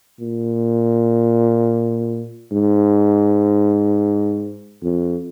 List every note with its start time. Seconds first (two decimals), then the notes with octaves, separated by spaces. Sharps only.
0.20 A#2
2.51 G#2
4.82 F2